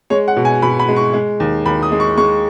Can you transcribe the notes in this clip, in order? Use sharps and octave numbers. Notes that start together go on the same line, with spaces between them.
G#3 C#5
F#5
B2
G#5
B2 B5
B5
G#3
C#6
G#3
D#2
D#2 B5
D#6
G#3
C#6
G#3 C#6